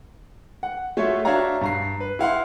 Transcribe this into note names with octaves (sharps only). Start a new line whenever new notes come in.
F#5
A3 F4 F#4 A4 C#5 E5
D4 F#4 C#5 E5 F5 A#5
G2 A#5 C7
B4
E4 F5 F#5 C6